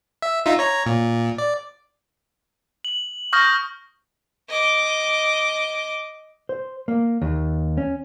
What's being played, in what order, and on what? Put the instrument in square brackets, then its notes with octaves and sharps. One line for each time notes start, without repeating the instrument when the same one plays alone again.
[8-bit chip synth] E5
D#4 F4 E5
C#5 A#5
A#2
D5
[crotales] F#7
C#6 D#6 F6 G6 A#6
[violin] D#5 D6
[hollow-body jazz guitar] C5
A#3
D#2
C#4